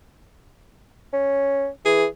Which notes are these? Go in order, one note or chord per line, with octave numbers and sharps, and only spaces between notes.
C#4
E3 G#4